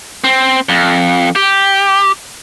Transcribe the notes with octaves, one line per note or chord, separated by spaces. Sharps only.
C4
F2
G4